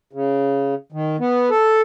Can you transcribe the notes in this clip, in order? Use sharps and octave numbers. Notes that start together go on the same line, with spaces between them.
C#3
D#3
B3
A4